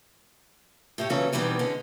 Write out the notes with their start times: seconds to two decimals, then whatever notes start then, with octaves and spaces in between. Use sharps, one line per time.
0.98 A2 G4 C#5
1.10 A#2 C#3 E3 F#3 C#4 A4
1.33 B2 D#3 E3 G3 C4
1.59 D3 G#3 C#4